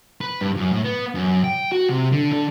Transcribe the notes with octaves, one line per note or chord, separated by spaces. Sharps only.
B4
G2
F#2
A2
B3
F#2
G5
F#4
C3
D3
D3